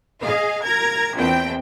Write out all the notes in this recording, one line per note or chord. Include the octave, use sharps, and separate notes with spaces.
G#4 D#5 F5
A#4 A#5 G#6
A#1 E2 C4 G5